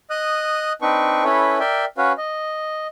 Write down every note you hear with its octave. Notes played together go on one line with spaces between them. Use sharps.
D#5 D#6 F#6
C4 D4 D#4 B4 C#6
C#4 E4 A4 B4 C#5
A#4 D5 E5 G5
C#4 F#4 B4 C#5 F5
D#5